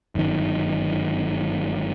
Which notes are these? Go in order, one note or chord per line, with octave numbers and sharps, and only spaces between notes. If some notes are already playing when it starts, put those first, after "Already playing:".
G1 F#2 D3 D#3